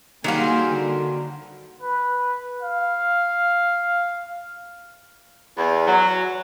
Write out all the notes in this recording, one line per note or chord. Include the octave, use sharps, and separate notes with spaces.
D#3 F#3 G3 A#3 G#4 C5 F5 G5
D3
B4
F5
E2
F#3